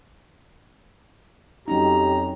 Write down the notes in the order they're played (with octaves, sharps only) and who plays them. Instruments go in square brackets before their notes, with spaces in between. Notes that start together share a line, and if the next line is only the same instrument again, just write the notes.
[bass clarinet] F2 [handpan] F#3 C#4 D#4 [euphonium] G4 [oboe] A#5